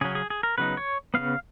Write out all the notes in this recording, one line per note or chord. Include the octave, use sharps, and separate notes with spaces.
C#3 F#3 C#4 G#4
G#4
G#4
A#4
C#3 F#3 B3 D#4 B4
C#5
C#3 F3 B3 F5